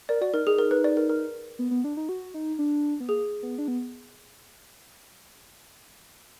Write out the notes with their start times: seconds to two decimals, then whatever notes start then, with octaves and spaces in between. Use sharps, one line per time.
0.09 A#4 D5
0.21 F#4 D5
0.34 D#4 A#4
0.47 D#4 G#4
0.59 A#4
0.71 B4
0.84 D5
0.97 A#4
1.10 A#4
1.59 B3
1.71 B3
1.84 D4
1.97 D#4
2.09 F#4
2.34 D#4
2.59 D4
3.00 B3
3.09 A#3 G#4
3.43 B3
3.58 D4
3.68 B3